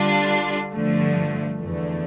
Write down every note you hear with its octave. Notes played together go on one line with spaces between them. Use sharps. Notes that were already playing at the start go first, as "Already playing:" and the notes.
Already playing: D3 G3 D4 F4
G2 D3 F3 A3
E2 D3 A3